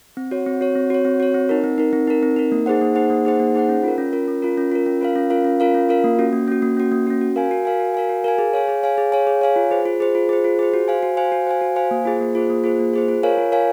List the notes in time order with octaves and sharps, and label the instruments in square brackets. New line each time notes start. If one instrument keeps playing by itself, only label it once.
[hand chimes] C4
F#4 C#5
C4
F#4 C#5
C4
F#4 C#5
C4
F#4 C#5
C4
D#4 A#4
C4
D#4 A#4
C4
D#4 A#4
C4
D#4 A#4
A#3
D#4 G#4 C5 F#5
A#3
D#4 G#4 C5 F#5
A#3
D#4 G#4 C5 F#5
A#3
D#4 G#4 C5 F#5
C#4
F4 A#4
C#4
F4 A#4
C#4
F4 A#4
C#4
F4 A#4
C#4
F4 A#4 F5
C#4
F4 A#4 F5
C#4
F4 A#4 F5
C#4
F4 A#4 F5
A#3
C#4 F#4
A#3
C#4 F#4
A#3
C#4 F#4
A#3
C#4 F#4
F#4
A#4 F5 G#5
F#4
A#4 F5 G#5
F#4
A#4 F5 G#5
F#4
A#4 F5 G#5
G#4
C#5 F5 G#5
G#4
C#5 F5 G#5
G#4
C#5 F5 G#5
G#4
C#5 F5 G#5
F4
G#4 C5
F4
G#4 C5
F4
G#4 C5
F4
G#4 C5
F#4
C5 F5 G#5
F#4
C5 F5 G#5
F#4
C5 F5 G#5
F#4
C5 F5 G#5
A#3
F4 G#4 C5
A#3
F4 G#4 C5
A#3
F4 G#4 C5
A#3
F4 G#4 C5
F4
A#4 C#5 F5 G#5
F4
A#4 C#5 F5 G#5